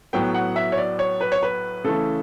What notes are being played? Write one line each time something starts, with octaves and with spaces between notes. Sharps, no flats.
A2 F#3 B3 G5
F#5
E5
C#5
D5
C#5
B4
C#5
B4
C#3 E3 A3 A4